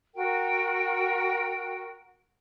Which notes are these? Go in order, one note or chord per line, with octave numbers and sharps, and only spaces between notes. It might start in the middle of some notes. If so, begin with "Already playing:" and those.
F#4 A#4 G5